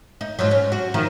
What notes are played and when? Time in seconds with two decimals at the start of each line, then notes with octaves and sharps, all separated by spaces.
0.21 D#4
0.39 G#2 F3 F#3
0.51 C#4
0.72 F#4
0.94 D#3 F3